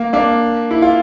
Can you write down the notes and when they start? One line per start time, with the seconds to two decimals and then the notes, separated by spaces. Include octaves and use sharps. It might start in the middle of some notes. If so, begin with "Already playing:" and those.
Already playing: A#3
0.13 A#3 D4
0.71 E4
0.82 F4